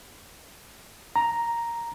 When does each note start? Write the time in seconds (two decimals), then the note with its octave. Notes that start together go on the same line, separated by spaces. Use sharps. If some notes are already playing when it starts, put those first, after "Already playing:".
1.16 A#5